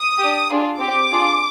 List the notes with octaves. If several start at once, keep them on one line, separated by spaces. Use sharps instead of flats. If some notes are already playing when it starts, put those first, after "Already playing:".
Already playing: D#6
D4 G4
D4 F4 G#4
C4 G4 D6
D4 F4 G#4